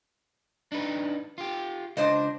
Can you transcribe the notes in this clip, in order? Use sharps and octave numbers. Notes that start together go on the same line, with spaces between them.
D4 D#4 B4
F4 G4
C#2 D4 C5 D#5